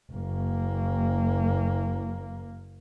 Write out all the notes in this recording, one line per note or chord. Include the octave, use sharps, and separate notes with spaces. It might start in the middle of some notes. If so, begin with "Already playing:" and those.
F#1 A#3